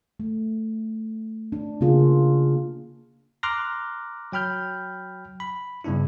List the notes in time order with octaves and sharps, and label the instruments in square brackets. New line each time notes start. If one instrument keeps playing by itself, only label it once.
[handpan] A3
D4
C#3 A#3 F4 G#4
[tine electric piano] A#5 C6 D6 F6 F#6 A#6
F#3 G5 B5 F6 G6
B5
G2 C#3 B3 D4 E4